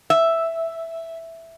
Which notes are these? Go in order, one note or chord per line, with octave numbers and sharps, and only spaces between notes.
E5